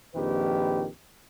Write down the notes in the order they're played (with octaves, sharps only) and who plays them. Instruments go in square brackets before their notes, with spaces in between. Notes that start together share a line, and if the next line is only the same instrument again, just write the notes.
[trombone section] A#1 F2 D#3 G4 B4